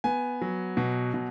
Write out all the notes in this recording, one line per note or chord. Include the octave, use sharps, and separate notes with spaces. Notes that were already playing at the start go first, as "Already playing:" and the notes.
B3 G#5
F#3
B2
B2